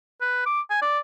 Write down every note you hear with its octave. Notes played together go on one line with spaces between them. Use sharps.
B4
D6
G#5
D5